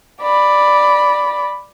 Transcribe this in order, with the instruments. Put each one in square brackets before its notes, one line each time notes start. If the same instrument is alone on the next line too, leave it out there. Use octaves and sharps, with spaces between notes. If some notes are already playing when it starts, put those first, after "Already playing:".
[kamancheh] D5 B5